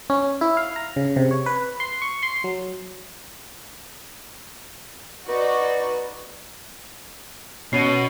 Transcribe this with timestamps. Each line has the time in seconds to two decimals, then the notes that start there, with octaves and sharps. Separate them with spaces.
0.10 C#4
0.41 E4
0.57 F5
0.76 A#5
0.96 C#3
1.16 C3
1.31 C#5
1.46 B4
1.80 C6
2.02 C#6
2.23 C6
2.44 F#3
5.29 D#4 F#4 B4 D5
7.73 B2 C#4 C7 D#7